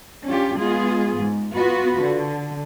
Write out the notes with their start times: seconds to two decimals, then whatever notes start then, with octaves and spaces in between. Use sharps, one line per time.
0.25 C#4 D4 F4 G4
0.58 G#3 B3 F4 G#4
1.16 G#2
1.54 B3 F4 F#4 B4
2.01 D3